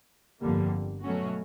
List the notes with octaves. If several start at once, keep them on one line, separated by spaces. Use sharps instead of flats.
G1 F2 D3 G3 A#3
B2 F#3 A3 C#4 F#4